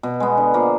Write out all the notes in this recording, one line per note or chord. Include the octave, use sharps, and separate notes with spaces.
B2
G#3 B3
D3
F3 A#3